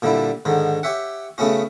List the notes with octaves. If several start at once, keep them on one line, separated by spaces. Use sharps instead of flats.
A#2 D3 G3 E4
G#2 D3 D#3
G4 C#5 E5 F#5
C#3 A3 B3 C#4 F#4